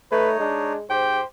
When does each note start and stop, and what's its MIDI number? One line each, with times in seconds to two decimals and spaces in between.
0.12 0.38 57
0.12 0.73 63
0.12 0.30 71
0.12 0.73 73
0.40 0.84 56
0.40 0.76 62
0.90 1.20 44
0.90 1.21 67
0.90 1.25 72
0.90 1.22 79